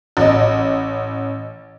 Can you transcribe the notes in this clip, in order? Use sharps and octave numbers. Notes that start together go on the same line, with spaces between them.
A1 D#5